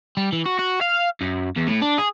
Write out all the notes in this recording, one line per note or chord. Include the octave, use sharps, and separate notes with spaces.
G3
E3
F#4
F#4
F5
F#2
E2
A2
D4
G#4